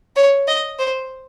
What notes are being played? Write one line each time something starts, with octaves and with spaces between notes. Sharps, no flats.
C#5
D#5
C5